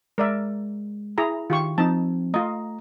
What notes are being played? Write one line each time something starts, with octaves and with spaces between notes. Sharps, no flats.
G#3 A#4 D5 E5
E4 G#4 A#5
D#3 F4 G4 C#6
F3 C4 D#4 A5
A3 F4 D#5 A#5